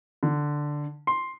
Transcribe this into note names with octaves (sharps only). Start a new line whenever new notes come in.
D3
C6